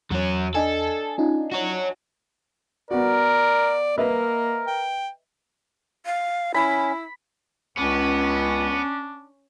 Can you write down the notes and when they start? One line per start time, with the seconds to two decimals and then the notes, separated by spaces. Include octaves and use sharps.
0.11 E2 F#3 C#4
0.54 D4 A4 D#5 G#5
1.18 C#4 D#4 F4
1.52 F#4 C#5
2.91 B3 F#4 A#4 D5
3.98 A#3 A#4 B4 D#5 E5
4.67 G5
6.06 F5
6.54 C#4 E4 B5
7.77 C#2 B3 C#4 D4